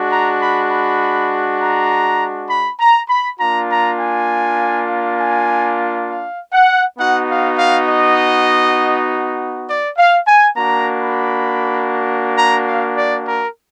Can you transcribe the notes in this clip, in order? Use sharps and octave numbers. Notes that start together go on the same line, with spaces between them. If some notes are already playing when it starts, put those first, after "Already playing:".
Already playing: G#3 D4 F#4
A#5
B5
B5
A#5
B5
A#5
B5
A#3 D4 F4 A#5
A#5
G#5
G#5
F5
F#5
B3 D#4 F#4 F#5
F5
F5
D#5
D5
F5
G#5
A#3 D4 F#4 A#5
B5
A#5
F5
D5
A#4